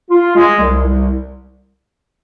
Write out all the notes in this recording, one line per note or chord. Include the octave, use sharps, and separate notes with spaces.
F4
G#3
C2
C2